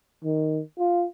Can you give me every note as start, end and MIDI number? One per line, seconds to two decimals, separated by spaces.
0.24 0.61 51
0.78 1.05 65